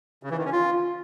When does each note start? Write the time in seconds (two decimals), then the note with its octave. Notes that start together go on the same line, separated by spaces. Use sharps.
0.23 C#3
0.30 E3
0.38 D#3
0.45 C#4
0.52 F4